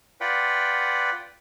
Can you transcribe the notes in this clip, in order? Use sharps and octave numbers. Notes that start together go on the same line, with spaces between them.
F4 B4 D5 F#5 G5